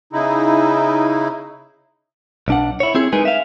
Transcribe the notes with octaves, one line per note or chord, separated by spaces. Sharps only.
C#3 D#4 E4
B1 D4 F#5
E4 C#5
C4 E4 G#4
G#3 D#4 G#4 A#4 B4
E5 F5